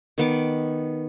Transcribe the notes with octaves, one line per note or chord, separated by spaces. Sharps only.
D#3 B3 D6